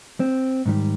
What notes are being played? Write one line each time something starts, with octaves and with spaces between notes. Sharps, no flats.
C4
G#2 D#3 G3